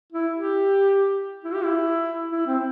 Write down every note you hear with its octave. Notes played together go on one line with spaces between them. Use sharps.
E4
G4
E4
G4
E4
E4
C4